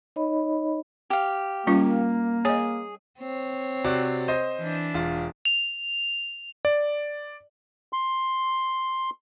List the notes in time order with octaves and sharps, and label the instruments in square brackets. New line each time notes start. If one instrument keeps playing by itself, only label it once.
[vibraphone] D#4 C#5 D#5 B5
[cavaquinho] G4 F5
[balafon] G3 C#4 F4 [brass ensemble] A#3
[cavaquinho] G#4 [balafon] C#5 D#5
[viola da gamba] C4 C#5
[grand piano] C3 F#4 D5
C5 D#5
[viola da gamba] E3 D4
[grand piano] E1 F4
[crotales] F7
[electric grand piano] D5
[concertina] C6